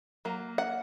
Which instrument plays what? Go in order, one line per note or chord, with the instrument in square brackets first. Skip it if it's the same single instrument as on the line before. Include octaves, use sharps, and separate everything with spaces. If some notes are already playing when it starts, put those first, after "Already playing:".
[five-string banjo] F#3 A#3
F#5